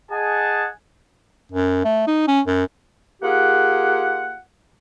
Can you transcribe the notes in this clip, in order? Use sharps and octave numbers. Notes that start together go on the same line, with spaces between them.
G#4 D#5 F#5 G#5 A5
F#2
A3
D#4
C#4
F#2
A#3 F4 G4 G#4 F#5